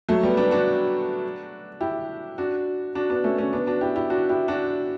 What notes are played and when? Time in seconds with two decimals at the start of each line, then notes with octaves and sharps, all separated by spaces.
0.08 F#3 A3
0.23 G3 B3
0.37 B3 D4
0.51 D4 F#4
1.81 E4 G4
2.38 D4 F#4
2.95 D4 F#4
3.10 B3 D4
3.24 A3 C#4
3.38 A3 C#4
3.53 B3 D4
3.67 D4 F#4
3.81 E4 G4
3.96 E4 G4
4.10 D4 F#4
4.29 E4 G4
4.48 D4 F#4